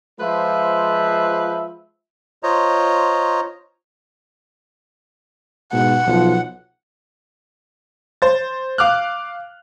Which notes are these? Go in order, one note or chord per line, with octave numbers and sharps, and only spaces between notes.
F3 G#3 F4 B4 C5 E5
F4 C5 C#5 D#5 A#5
G#2 B2 F#5
B1 F3
C5 A6
F5 D6 F6 F#6